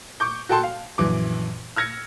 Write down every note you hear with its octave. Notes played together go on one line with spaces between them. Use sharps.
C#6 D6 G6
F#4 A4 G5 A5 C6
F5
A#1 F#2 E3 D6
E6 F6 G#6 A#6 C#7